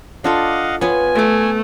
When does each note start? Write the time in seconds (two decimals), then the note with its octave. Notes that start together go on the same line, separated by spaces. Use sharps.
0.24 D4 F4 A4 D#5 F5 F#5
0.81 B3 F4 B4 C#5 G#5
1.15 A3 E5 D6